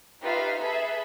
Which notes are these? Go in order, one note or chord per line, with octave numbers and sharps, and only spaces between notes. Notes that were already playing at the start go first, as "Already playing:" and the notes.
D#4 F4 G4 B4 E5 F5
G#4 A4 B4 E5